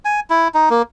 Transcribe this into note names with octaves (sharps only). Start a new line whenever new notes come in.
G#5
E4
D#4
A#3